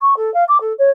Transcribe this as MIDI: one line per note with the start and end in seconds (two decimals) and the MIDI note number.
0.01 0.14 85
0.16 0.32 69
0.34 0.44 77
0.48 0.58 86
0.60 0.73 69
0.78 0.90 73